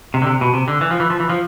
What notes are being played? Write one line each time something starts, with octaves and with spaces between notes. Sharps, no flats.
C3
D3
C3
B2
C3
D3
E3
F3
E3
F3
E3
F3